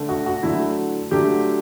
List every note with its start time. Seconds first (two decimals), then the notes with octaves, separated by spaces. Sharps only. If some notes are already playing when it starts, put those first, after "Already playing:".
Already playing: D3 A3
0.09 F#4
0.26 F#4
0.43 D3 F#3 A3 E4
1.11 D3 F#3 A3 G4